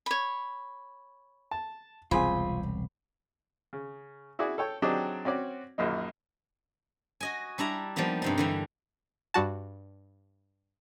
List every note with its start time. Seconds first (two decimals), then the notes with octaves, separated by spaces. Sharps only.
0.06 C#5 B5
1.51 A5
2.11 E1 C2 C4 F4 G#4 G#5 B5
3.73 C#3
4.39 E4 F#4 G#4 D5
4.58 A4 C#5 G5
4.82 F#3 C4 D4 D#4 G4 G#4
5.25 C4 C#4 F#4 D5
5.78 A#1 F#2 A#3 D#4
7.21 F#4 D#5 G#5
7.58 G3 D4 E4 A#5
7.96 F3 G3 A#3 B3 D#4
8.22 G2 C3 D#4
8.38 D3 E3 G3
9.34 G2 G3 F#4 A5